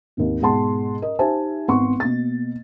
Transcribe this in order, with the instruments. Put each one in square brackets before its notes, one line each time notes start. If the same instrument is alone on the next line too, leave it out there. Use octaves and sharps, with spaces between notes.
[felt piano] G#1 D#2
G#2 B2 G#4 F#5 A5 C6
A#4 D#5
D#4 G4 C5 E5 G#5 A5
G#1 B3 F#5 C6 C#6
B2 A#3 A6